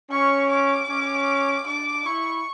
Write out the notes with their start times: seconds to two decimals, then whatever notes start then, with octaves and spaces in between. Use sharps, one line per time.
0.11 C#4 C#6
0.50 D6
0.88 C#4
1.66 D4 D6
2.05 E4 C#6